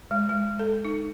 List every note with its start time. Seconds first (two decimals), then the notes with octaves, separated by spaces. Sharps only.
0.11 G#3
0.29 G#3
0.59 A4
0.85 D#4